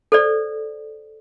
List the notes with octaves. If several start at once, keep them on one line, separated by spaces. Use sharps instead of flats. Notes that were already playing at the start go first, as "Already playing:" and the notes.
A4 C5 D5